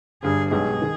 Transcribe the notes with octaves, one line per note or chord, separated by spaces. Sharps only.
G1 G2 G3 G#4
B1 B2 G#3 D#4 G4 G#4
D#3